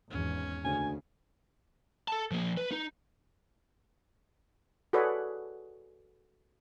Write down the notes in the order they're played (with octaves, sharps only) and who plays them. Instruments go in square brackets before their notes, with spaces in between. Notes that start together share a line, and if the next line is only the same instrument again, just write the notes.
[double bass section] G#1 E2 [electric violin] C#4
[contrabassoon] D2 [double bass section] C#3 [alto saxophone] G#5
[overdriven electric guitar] A4 A5
F3 A#3
B4
D#4
[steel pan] F#4 G#4 A4 B4 C#5 D5